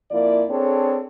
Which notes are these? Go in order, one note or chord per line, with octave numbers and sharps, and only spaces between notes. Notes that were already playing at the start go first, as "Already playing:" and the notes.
F2 F3 A#3 E4 D5
C4 D4 G#4 A4 C#5